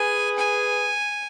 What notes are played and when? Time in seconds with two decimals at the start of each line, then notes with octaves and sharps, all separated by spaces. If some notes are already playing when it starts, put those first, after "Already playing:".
Already playing: G#4 B4 G#5
0.38 G#5